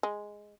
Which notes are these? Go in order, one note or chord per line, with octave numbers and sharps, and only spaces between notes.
G#3